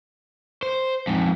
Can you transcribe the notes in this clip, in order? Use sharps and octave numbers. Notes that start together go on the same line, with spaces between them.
C5
F2 G#2